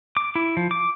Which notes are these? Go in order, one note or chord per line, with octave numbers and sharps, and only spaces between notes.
D6
E4
F3
D6